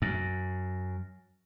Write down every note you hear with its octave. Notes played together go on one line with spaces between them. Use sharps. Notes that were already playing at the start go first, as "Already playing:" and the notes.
F#2